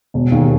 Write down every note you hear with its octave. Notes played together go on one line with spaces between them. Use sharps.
E1
D#2 D#3